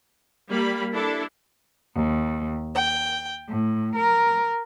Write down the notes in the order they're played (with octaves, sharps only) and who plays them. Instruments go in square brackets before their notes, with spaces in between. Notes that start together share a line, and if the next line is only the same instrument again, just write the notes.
[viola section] G3 A#3 B5
D4 E4 A4
[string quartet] D#2
G5
A2
A#4